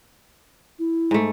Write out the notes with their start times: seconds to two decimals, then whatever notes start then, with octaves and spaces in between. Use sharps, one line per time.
0.79 E4
1.11 G#2 A3